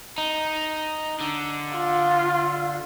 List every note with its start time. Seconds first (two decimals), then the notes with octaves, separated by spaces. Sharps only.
0.18 D#4
1.21 D3
1.76 F4